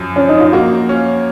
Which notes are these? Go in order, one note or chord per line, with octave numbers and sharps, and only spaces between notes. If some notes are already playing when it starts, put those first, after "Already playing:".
Already playing: F#2 F3
F3 C#4
D#4
F4
A#3 F#4
C#4